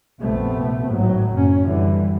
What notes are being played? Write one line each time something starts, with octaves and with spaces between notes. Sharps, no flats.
A#1 F2 C3 A3 B3 C4
G#1 A2 F#3
F#1 C#4
F#2 D3 E3 G3